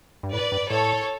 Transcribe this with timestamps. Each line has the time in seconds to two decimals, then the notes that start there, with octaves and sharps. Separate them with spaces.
0.23 G2
0.33 A2 B4 D5
0.52 G2
0.70 A2 A4 C#5